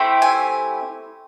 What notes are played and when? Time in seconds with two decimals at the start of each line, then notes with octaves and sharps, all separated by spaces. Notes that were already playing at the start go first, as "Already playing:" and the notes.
Already playing: A3 C4 E4 G4
0.22 G#5